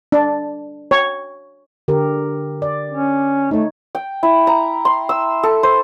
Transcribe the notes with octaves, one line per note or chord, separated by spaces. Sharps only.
D4
C#5
D3 G4 A#4
D5
C#4
A3 D#4 C#5
G5
E4
A#5
C6
E6
A4
C5